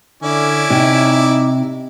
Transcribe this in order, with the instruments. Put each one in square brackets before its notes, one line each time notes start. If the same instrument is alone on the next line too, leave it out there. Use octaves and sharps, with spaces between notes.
[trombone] D3 [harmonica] C#4 E4 D5
[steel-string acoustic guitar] C3 [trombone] D#4